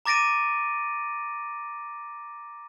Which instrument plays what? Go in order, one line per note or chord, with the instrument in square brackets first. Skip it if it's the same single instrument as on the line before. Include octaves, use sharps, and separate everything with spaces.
[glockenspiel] A#5 D6 A6 A#6 D7 D#7